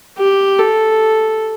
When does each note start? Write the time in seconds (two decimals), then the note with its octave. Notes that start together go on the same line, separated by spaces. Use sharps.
0.18 G4
0.58 A4